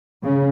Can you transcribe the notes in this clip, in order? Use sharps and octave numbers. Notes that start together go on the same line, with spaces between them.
C#3